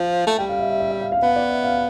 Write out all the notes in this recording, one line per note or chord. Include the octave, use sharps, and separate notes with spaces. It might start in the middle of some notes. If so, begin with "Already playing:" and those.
Already playing: F3 F5
A3
G3 G5
F5
E5
E5
E5
E5
F5
F5
B3 F5
D5
E5
F5